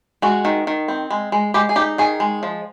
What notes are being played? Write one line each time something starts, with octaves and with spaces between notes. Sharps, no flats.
G#3 F#4
D#3
D#3
C4
G#3
G#3
G#3 G4
G#4
D#4 G4
D#3 G#4
G#3
F3